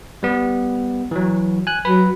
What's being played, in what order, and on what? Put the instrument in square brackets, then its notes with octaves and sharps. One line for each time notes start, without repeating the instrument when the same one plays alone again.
[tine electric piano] G3 B3
E3 F#3
G#5 F#6
[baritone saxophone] F#3 [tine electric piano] B4 B5